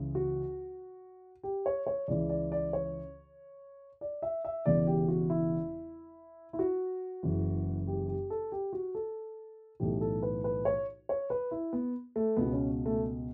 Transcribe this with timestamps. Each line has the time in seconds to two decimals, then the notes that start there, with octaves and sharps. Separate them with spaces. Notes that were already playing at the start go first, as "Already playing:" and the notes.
Already playing: C#2 C#3 E3
0.15 F#4
1.44 G4
1.66 C#5
1.87 C#5
2.08 C#2 C#3 E3 D5
2.29 D5
2.52 D5
2.73 C#5
4.01 D5
4.22 E5
4.45 E5
4.66 E1 E2 C#3 E3 D5
4.87 G4
5.08 F#4
5.30 E4
6.53 E4
6.59 F#4
7.23 F#1 F#2 C#3 E3
7.87 G4
8.08 G4
8.30 A4
8.52 G4
8.73 F#4
8.95 A4
9.80 B1 A2 E3 G4
10.01 A4
10.23 B4
10.44 B4
10.65 C#5
11.09 C#5
11.30 B4
11.51 E4
11.73 B3
12.16 A3
12.37 C#2 B2 B3
12.53 C#4
12.86 A3